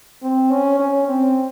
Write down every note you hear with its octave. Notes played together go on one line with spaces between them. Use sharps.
C4
C#4
C#4
C4